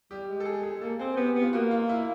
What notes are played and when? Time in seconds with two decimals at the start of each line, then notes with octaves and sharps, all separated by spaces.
0.11 G3 G4
0.29 G#3
0.40 A4
0.45 G#4
0.63 G#4
0.81 A#3 A4
0.99 C4 G#4
1.17 B3 G4
1.35 B3
1.42 F4
1.53 A#3 F#4
1.71 F4
1.89 E4